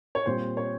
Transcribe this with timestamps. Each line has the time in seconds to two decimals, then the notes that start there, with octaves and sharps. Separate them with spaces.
0.15 C#5
0.26 A#2 G3 C4 C5
0.57 C#5